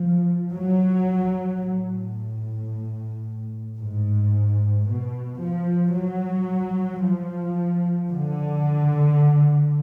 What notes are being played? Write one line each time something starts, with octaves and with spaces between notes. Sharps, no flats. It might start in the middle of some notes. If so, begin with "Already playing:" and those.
Already playing: F3
F#3
A2
G#2
B2
F3
F#3
F3
D3